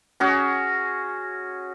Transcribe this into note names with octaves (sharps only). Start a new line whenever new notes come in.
C#4 F#4 G#4